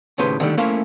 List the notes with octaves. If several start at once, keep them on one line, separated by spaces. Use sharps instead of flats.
D#2 A2 C#3 B4 C5
D3 D#3 F3 G3 A3
A3 A#3 C#4 E4 C5 F5